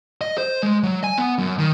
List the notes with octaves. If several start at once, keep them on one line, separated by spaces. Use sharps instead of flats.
D#5
C5
G#3
F#3
G#5
B3
F#2
D#3